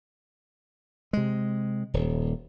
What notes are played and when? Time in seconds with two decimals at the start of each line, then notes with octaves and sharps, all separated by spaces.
1.13 C3 G#3
1.94 D#1